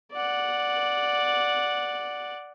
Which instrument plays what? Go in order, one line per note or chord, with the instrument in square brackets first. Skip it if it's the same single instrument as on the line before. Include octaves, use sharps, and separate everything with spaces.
[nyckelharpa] D5 F#5